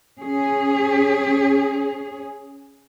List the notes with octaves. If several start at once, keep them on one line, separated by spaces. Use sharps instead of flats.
C#4 G#4